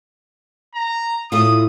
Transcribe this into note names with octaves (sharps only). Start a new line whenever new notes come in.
A#5
A2 F4 D#6